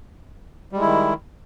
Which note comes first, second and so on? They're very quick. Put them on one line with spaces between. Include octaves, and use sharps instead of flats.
G3 G#3 E4 D#3